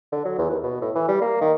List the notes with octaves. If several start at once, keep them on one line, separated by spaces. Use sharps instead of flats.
D3
F#3
E2
D#2
B2
A2
E3
G3
A#3
D#3